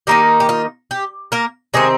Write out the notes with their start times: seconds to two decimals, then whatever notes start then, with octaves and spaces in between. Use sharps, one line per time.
0.07 D#3 A#3 D#4 G4
0.40 G4
0.49 F4
0.91 G4
1.32 A#3 A#4
1.74 C3 D#3 G#3 C4 G#4